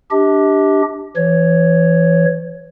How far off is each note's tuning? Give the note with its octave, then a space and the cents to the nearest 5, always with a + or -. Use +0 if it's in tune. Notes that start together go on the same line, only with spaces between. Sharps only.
D4 +0 G4 +0 D#5 +45
E3 +35 C#5 +0